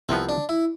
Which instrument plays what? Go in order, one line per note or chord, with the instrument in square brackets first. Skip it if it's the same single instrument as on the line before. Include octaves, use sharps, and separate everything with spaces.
[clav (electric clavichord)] C2 C3 F3 B3 [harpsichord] C4
[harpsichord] D4
E4